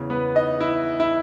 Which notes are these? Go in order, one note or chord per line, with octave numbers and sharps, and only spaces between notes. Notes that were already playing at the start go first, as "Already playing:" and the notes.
Already playing: E2 C#3 E3
B3 B4
D#4 D#5
E4 E5
E4 E5